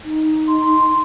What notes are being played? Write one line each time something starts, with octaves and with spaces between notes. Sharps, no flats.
D#4
C6